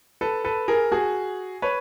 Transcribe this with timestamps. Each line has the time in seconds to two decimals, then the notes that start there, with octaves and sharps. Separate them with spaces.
0.21 A4 B4
0.44 A4 B4
0.68 G#4 A#4
0.92 F#4 G#4
1.62 B4 C#5